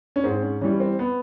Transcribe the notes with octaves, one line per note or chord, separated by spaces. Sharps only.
C#4
G#2 C4
C#4
E3 G3 C#4
C4
B3